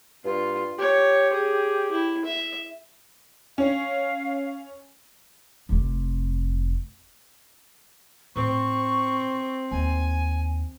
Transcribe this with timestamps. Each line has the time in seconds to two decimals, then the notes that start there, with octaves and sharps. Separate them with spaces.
0.25 G2 F4
0.78 G4 C#5
1.33 G#4
1.91 E4
2.25 E5
3.58 C#4 F5
5.69 F1 C3
8.36 A2 C4 E4 C#6
9.71 D#2 G#5